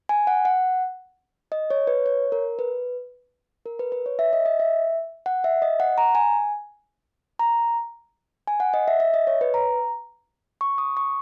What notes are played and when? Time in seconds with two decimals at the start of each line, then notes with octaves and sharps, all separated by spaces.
0.09 G#5
0.27 F#5
0.45 F#5
1.52 D#5
1.70 C#5
1.87 B4
2.06 C#5
2.32 A#4
2.59 B4
3.66 A#4
3.79 B4
3.92 B4
4.06 C#5
4.19 E5
4.33 D#5
4.46 D#5
4.60 E5
5.26 F#5
5.44 E5
5.62 D#5
5.80 F#5
5.98 A#5
6.15 G#5
7.39 A#5
8.47 G#5
8.60 F#5
8.74 D#5
8.88 E5
9.00 E5
9.14 D#5
9.27 C#5
9.41 B4
9.54 A#5
10.61 C#6
10.78 D#6
10.97 C#6